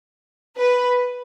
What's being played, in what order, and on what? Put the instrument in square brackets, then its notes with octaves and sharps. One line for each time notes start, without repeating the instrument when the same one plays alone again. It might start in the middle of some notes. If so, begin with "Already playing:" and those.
[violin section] B4